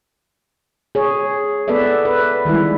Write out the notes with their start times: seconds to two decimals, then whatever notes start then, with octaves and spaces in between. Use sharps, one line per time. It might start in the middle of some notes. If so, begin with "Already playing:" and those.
0.95 G#4 C#5
1.68 B3 A4 B4 D5 E5
2.05 B4
2.45 D#3 G3 G#3 E4